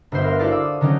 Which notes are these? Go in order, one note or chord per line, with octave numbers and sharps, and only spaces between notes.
G1 B3 C5 E5
A#4 B4 F5 C6
E4 F#4 A4 C5 D5 F5
F5 D6 E6
D#6
D3 D#3 F#3 C#4 D#4